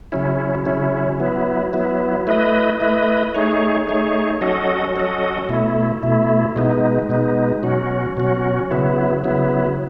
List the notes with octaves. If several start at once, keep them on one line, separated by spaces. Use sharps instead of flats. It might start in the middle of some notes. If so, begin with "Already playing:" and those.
C#3 F#3 C#4 E4
C#3 F#3 C#4 E4
F#3 B3 E4
F#3 B3 E4
A3 E4 B4 D#5
A3 E4 B4 D#5
A3 D#4 G#4 C#5
A3 D#4 G#4 C#5
F#3 C#4 F#4 A4 D#5
F#3 C#4 F#4 A4 D#5
B2 A3 E4
B2 A3 E4
B2 G#3 B3 D#4
B2 G#3 B3 D#4
B2 F#3 C#4 F#4
B2 F#3 C#4 F#4
C#3 F#3 B3 E4
C#3 F#3 B3 E4